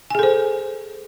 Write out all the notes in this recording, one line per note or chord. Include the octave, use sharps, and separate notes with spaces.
G#4 A4 C5 G#5